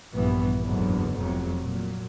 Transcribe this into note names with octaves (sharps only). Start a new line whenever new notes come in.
A#1 G2 E3 G3 B3
F#1 E2 G#2 D3 F#3 B3
F1 F2 C3 F#3
A#2 F#3